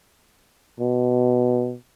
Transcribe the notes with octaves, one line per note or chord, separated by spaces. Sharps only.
B2